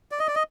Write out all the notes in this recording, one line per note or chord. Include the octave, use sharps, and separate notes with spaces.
D5
D#5
D5
D#5